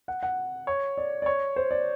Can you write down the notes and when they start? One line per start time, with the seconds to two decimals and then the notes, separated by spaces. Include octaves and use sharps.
0.08 F#5
0.23 F#5
0.67 C#5
0.98 D5
1.22 D5
1.26 C#5
1.56 C5
1.71 D5